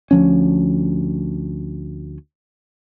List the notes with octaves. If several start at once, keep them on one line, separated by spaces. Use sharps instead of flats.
D2 F3 C#4